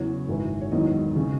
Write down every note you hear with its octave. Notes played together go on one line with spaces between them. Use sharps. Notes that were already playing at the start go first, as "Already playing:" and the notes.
Already playing: E2 C#3 F#3 C#5
G#1 F#2 E3
C#5
E1 E2 D#3 F#3 D#5
C#3